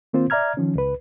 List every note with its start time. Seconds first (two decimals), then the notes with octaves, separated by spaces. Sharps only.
0.13 D#3 A#3 C4 F4 C5
0.30 D5 E5 A#5 F6 G#6
0.57 D#3 F3 C#4
0.75 C#2 B4